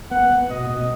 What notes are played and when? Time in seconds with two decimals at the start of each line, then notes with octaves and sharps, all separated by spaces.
0.11 B3 F#5
0.31 B3
0.50 B2 D#5
0.70 B2